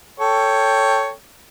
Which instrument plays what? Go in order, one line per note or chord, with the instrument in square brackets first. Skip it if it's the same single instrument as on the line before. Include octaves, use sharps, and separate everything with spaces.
[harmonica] A4 C#5 G5